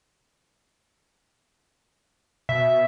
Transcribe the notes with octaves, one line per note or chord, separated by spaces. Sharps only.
B2 E5